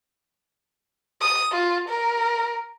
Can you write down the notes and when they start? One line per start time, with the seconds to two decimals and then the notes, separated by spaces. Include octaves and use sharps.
1.21 D#6
1.52 F4
1.89 A#4